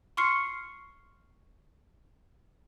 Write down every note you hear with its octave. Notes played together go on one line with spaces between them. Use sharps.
C6 C#6 F6 C7 C#7